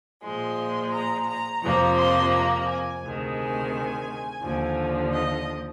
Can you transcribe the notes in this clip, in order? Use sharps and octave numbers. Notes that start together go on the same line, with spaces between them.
A#2 F3 G#3 C6
A#5
A#5
F2 C3 F3 A#3 A#5
C6
A#5
G#5
D2 C3 D#3 G#3
G#5
D#2 D3 F3
D#5